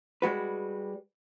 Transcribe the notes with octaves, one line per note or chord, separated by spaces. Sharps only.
G3 G#3 F#4 B4